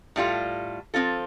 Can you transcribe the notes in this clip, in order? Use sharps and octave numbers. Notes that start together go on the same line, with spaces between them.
A2 G3 F4 A4
F3 C4 F4 A4